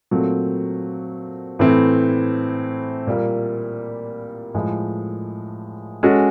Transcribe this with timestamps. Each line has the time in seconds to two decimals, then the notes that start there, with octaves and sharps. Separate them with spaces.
0.11 A#2 F#3 A3 C4
1.59 A2 E3 A3 C4
3.07 A#2 G3 A#3
4.54 A2 F3 G#3
6.03 G#3 C#4 F#4 A4